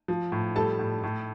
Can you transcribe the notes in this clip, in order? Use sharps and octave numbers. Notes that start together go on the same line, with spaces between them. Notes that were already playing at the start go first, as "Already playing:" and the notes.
F3
A2
G3 A4 A5
A2
A2